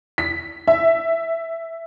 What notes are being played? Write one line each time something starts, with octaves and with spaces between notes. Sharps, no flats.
B6
E5